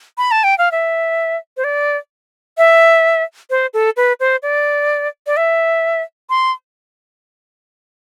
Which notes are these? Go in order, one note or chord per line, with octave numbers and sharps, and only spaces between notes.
B5
A5
G5
F5
E5
C5
D5
E5
C5
A4
B4
C5
D5
D5
E5
C6